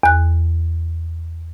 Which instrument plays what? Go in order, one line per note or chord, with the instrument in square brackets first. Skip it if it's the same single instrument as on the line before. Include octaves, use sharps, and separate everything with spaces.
[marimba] E2 F#6